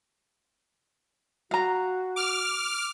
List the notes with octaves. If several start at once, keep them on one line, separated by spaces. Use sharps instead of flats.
F#4 F5 A#5
D6 F6